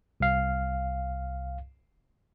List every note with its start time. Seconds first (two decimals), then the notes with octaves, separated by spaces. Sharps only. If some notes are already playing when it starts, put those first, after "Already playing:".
0.20 C2 F5